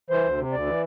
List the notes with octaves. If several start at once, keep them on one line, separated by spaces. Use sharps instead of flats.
E3 C5
D2
C3
D2 D5
E3